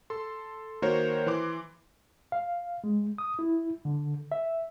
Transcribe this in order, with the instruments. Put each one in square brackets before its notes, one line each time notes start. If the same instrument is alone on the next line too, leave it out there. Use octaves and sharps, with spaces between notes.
[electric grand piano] A4 C6
D#3 A#3 F#4 A#4 C5 C#5
E3 C6 D6
[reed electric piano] F5
G#3
D#6
E4
D3
E5